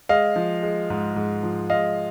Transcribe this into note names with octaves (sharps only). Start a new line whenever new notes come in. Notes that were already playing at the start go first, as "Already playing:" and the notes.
G#3 D#5 F5
F3
G#3
G#2
G#2
F3
G#3 D#5 F5